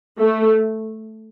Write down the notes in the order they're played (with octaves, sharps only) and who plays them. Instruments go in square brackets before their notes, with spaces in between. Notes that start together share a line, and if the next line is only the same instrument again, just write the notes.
[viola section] A3